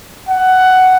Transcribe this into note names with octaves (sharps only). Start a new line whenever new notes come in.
F#5